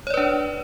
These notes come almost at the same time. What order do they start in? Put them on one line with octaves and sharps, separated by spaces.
C#5 D5 B4 D4